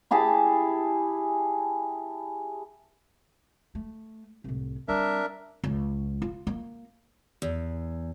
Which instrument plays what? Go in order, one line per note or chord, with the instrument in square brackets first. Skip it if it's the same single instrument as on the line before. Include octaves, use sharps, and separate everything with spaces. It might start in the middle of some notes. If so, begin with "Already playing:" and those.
[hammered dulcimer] E4 G4 G#4 A5
[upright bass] A3
C2 A2
[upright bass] G3 C4 [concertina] D4 A#4 E5
[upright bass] C#2
F4
A#3
[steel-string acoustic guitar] E2